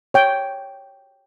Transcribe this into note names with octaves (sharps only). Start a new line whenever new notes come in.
C#5 G5